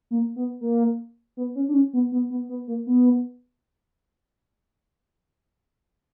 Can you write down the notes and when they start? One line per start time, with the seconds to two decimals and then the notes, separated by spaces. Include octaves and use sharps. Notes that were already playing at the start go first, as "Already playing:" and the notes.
0.11 A#3
0.36 B3
0.61 A#3
1.37 B3
1.55 C#4
1.68 D4
1.74 C#4
1.93 B3
2.12 B3
2.30 B3
2.49 B3
2.67 A#3
2.87 B3